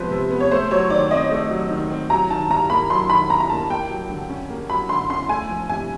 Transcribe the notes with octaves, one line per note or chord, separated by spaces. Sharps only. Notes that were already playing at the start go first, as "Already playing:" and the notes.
Already playing: C3 F3 G#3 B3 B4 C5
C3
B3
C#5
A3 C5
F#3 C#5
D#3 D5
C4 D#5
A3
F#3
D#3
C4
F#3 A#5
D#3 A5
G2 A#5
A#3 B5
F#3 C6
D#3 B5
G2 A#5
A#5
A#3 A5
A#3 G5
F#3
D3
C#4
A#3
F#3 B5
D3 C6
C#4 C6
A3 G#5
F3
C3 G#5